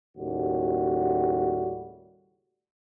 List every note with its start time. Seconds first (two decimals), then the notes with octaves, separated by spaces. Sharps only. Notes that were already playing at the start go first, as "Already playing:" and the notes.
0.17 D#2 A2 C#3 G3 F#4